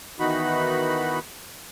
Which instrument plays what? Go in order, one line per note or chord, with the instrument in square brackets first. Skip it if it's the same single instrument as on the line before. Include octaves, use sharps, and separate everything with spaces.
[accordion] D#3 E3 B3 D#4 F#4 B5